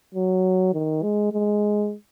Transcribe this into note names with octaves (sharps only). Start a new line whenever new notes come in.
F#3
D#3
G#3
G#3